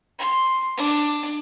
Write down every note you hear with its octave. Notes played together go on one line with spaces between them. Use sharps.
C6
D4